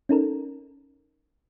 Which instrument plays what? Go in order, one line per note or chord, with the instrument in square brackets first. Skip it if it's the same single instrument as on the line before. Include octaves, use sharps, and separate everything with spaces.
[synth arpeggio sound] C#4 D#4 A4 A#4